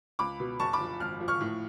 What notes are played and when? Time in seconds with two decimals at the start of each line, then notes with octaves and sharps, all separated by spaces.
0.19 C#2 B5 D6
0.40 B2
0.59 F#1 A5 C#6
0.73 B5 D6
0.80 F3
1.00 G#1 F6
1.20 F3
1.28 C#6 F6
1.41 A2